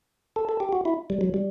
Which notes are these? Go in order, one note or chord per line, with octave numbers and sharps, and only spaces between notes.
A4
A4
G4
F#4
E4
G3
F#3
G3